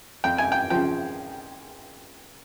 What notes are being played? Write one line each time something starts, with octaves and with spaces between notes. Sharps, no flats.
F2 G5
G#5
G5
C#3 F3 G5